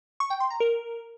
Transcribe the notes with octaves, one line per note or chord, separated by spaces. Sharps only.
C#6
G5
C6
A#5
A#4